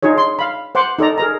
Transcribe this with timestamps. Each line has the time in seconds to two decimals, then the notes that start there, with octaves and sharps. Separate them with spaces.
0.03 D4 D#4 F4 G#4 C#5
0.18 C6
0.39 F5 B5
0.75 C5 F#5 C6 D6
0.99 D#4 A4 D5 A#5
1.18 G#4 A#4 A#5